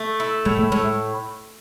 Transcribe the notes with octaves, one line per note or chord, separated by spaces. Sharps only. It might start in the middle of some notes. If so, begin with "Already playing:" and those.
Already playing: A3
E4
A2 G#3
A3
A2 G#3